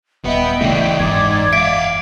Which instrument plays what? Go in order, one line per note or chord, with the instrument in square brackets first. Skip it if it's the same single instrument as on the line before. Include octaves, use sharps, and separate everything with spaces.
[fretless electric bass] D#1 [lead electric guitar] B3 B4 [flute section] D#5 E5 G5
[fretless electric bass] A1 C#3 A3 [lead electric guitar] E3 D4
[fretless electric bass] F#1 E2 E3 [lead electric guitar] G#2 [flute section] D5 D6 G#6
[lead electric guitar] E5 F5 [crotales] D7